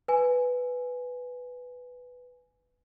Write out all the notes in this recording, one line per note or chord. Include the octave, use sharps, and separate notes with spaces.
B4 G#5